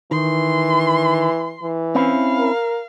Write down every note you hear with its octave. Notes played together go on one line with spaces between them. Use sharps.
D#3 E3 C6
E3
C4 C#4 E4 F5
A#4